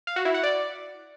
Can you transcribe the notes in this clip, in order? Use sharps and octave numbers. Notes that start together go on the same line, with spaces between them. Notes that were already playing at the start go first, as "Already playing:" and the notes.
F5
F#4
E4
F#5
D5